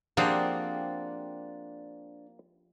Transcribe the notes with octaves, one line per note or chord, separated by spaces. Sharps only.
F3 A#3 C4 D4 G4 G#4 F5 F#5